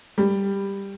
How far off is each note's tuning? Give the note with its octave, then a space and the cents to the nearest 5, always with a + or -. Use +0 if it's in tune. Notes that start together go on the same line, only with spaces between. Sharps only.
G3 +10